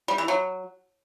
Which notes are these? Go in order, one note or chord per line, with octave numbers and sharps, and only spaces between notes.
G3
E3
F#3